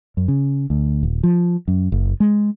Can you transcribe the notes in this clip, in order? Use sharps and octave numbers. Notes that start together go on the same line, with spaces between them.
F#2
C#3
D2
D#1
F3
F#2
F#1
G#3